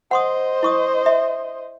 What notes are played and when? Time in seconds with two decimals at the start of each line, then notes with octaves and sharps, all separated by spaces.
0.11 C5 D#5 F#5 C6 D#6
0.63 E4 C#6 D#6
1.06 E5